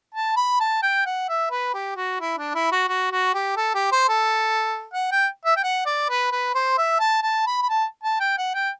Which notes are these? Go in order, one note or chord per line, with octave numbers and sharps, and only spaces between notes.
A5
B5
A5
G5
F#5
E5
B4
G4
F#4
E4
D4
E4
F#4
F#4
F#4
G4
A4
G4
C5
A4
F#5
G5
E5
G5
F#5
D5
B4
B4
C5
E5
A5
A5
B5
B5
A5
A5
G5
F#5
G5